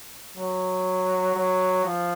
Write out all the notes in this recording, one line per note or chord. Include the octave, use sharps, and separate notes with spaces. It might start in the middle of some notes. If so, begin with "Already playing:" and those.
F#3
F#3
F3